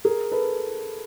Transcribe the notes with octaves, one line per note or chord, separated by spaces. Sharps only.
G#4 A#4
A4 B4